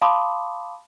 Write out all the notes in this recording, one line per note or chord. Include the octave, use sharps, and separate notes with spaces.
F5 A5 B5 C6 D6 D#6